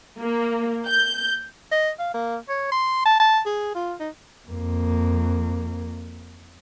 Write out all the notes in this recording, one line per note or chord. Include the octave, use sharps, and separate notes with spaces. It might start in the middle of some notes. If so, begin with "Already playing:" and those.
A#3
G6
D#5
F5
A#3
C#5
C6
A5
A5
G#4
F4
D#4
F2 A#3